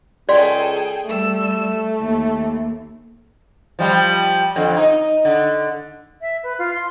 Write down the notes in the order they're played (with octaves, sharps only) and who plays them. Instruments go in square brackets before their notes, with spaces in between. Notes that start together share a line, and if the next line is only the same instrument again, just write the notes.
[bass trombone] C#2 [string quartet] G#4 A4 G5 [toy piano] D5 F5 C6
[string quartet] G3 E6 [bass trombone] A3
[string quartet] D#2
[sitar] F3 G3 F4
F2 D3
D#4
D3
[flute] E5
B4
F4
C6